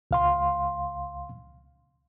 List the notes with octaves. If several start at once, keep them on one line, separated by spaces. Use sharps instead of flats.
C#2 F5 C6